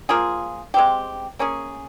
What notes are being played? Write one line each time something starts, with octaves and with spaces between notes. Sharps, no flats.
F3 A#3 F4 G#4
G#3 C4 G4
A#3 C#4 G#4